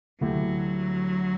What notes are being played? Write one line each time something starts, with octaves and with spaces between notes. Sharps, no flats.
D2 D3 F#3 A3 E4 G4